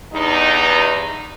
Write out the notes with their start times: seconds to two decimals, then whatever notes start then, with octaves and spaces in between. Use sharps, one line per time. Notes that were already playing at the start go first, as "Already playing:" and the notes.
0.13 E2 G2 D#4